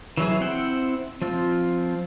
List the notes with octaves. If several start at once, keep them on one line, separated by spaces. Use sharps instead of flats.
E3 F#3 E4 G#4
C4 E4 F#5 G5
F3 C4 F4